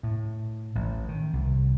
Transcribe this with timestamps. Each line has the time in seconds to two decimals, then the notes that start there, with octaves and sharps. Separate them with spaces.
0.03 A2
0.75 A1
1.09 D#3
1.33 C2